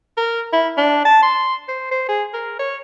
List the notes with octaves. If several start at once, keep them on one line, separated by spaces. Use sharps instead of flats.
A#4
E4
D4
A5
C6
C5
C5
G#4
A#4
C#5